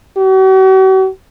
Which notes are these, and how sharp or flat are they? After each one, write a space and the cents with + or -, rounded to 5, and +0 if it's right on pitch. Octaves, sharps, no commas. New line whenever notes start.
F#4 +45